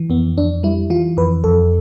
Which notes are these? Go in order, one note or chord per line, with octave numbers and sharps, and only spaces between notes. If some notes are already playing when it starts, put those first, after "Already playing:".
Already playing: E3
F2 B3
F2 D4
G3 E4
E3 F4
F2 B4
F2 A4